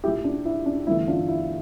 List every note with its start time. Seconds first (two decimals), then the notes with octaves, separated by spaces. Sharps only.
0.04 A#1 A#2 A3 E4 G4
0.24 D4
0.45 E4
0.66 D4
0.87 G1 G2 E3 A3 E4
1.08 D4 F4
1.28 E4